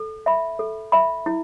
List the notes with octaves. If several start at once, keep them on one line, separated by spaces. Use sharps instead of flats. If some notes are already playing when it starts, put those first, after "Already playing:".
Already playing: A4
E5 B5
A4
E5 B5
E4